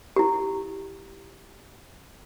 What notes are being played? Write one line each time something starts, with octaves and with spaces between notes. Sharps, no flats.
E4 G4